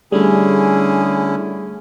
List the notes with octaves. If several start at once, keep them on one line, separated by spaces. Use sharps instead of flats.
D3 G3 A3 C#4 D4 E4 G#4